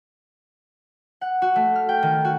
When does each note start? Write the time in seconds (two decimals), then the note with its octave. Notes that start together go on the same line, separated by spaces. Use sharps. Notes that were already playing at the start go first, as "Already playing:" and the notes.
1.21 F#5
1.42 F#4
1.56 A3
1.76 F6
1.89 G5
2.03 D#3
2.25 F#4